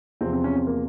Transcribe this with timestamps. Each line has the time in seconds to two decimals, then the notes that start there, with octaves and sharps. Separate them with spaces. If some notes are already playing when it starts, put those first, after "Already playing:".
0.21 E2 C3 F3 C4
0.33 C4
0.44 C#4
0.55 C4
0.67 A#3